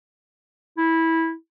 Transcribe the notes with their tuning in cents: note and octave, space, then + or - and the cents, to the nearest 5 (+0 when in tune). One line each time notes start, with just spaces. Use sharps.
E4 -15